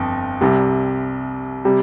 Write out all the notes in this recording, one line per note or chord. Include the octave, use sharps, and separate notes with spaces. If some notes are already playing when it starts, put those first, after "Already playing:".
Already playing: G1 F2
C2 C3 G3
C3 G3